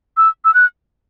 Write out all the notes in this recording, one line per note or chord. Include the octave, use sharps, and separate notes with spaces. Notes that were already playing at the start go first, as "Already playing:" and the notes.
E6
E6
F#6